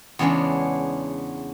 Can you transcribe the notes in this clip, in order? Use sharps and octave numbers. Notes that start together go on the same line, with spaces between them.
E2 C#3 G#3 B3 C#4 D4